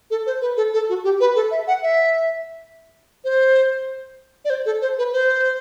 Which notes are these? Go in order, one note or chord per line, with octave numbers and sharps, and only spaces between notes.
A4
C5
B4
A4
A4
F#4
G4
B4
A4
E5
F#5
E5
C5
D5
C5
A4
C5
B4
C5